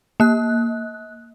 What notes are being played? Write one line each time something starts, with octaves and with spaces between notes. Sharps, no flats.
A#3 F#6